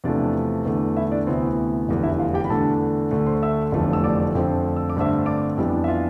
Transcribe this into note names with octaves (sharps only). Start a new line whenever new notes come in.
E2 C3 F3 A3 D4 D5
E2 D3 A3
E4 E5
D4 D5
D2 C3 E3 B3 C4 C5
F1 E2 D3
E4 E5
F4 F5
G4 G5
B5
E2 D3 A3 D4 A4 A5
D2 D3 A3
C5 C6
E5 E6
F1 E2 D3 F3 A3
E6
D5 D6
F2 D3 F3 A3 C4
E6
D6
G2 D3 A3 C4 E5 E6
D5 D6
F2 E3 G3 B3 D4
E5
F4 F5